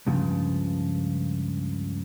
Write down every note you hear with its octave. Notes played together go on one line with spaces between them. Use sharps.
C#2 G2 C#3 F3